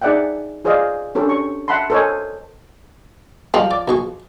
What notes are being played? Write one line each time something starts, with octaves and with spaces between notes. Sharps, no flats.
D#4 G#4 D5 E5 F#5 G5
F4 G#4 C5 D5 D#5 F5
C#4 D4 G4 A4 A#4 C5
C#6
E5 F#5 A5 B5 C6
A4 A#4 C5 C#5 D#5 G#5
F3 G3 G#3
D5
B1 G#4 C#6